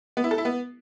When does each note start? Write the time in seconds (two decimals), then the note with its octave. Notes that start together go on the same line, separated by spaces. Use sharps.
0.17 B3
0.24 E4
0.31 A4
0.38 E4
0.45 B3